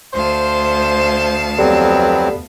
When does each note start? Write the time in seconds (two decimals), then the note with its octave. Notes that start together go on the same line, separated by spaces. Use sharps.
0.14 D2 C5 F5 A5
1.59 F2 F#3 B3 C4 G4 A4 D5